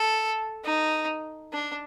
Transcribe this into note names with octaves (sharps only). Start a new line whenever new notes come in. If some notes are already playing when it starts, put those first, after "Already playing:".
Already playing: A4
D#4
D4